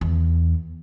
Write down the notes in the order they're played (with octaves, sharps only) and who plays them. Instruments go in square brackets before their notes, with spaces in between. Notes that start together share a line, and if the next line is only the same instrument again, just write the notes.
[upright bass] E2